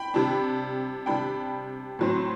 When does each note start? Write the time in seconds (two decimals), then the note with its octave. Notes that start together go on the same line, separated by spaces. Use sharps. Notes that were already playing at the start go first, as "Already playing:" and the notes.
Already playing: G5 B5
0.14 C3 G3 D4
1.06 C3 G3 D4 G5 B5
1.99 A2 F#3 C4